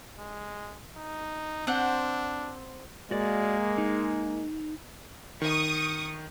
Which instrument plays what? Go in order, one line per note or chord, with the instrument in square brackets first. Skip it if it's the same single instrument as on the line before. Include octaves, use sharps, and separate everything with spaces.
[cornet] G#3
D#4
[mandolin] C4 C5 F#5 [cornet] D4
[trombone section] G#3 A#3 [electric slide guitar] F#4 D5
[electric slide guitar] D#4
[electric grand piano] D#3 [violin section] C#6 D#6